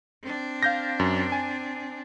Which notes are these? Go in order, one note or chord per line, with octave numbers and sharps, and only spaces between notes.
C4 D4
F5 G6 A#6
F#2
G#5